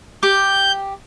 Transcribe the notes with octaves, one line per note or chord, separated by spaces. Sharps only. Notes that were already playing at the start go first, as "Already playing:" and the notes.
G4 G5 D6 G6